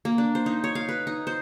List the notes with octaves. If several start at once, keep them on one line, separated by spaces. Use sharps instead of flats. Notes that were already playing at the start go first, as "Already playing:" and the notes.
A#3
D4
C5
D#4
C#5
F5
B4
D#4
C5